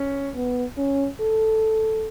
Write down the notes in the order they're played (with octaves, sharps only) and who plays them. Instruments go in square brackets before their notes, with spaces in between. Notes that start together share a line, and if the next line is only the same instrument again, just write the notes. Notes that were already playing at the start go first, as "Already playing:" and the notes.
Already playing: [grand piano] C#4
[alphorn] B3
C#4
A4